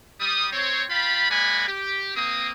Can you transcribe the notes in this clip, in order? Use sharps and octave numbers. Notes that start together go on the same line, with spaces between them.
G3 D#6
C4 C5 C#5
F4 F5 G5 A5 B5
G#3 A#3 D5 F#5 G#5 B5
G4
A#3 C4 D#6